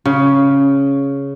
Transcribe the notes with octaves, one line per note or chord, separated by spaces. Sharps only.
C#3